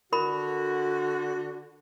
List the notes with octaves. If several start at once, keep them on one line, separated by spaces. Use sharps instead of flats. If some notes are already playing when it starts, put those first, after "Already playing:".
D3 F#4 A#4 B5